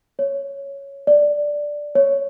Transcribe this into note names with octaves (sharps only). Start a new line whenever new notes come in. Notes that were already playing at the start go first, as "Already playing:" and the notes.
C#5
D5
C#5